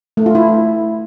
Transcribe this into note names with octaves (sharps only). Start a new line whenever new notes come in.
A3
F4
E4